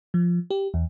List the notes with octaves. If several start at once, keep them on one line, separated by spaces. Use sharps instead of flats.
F3
G4
E2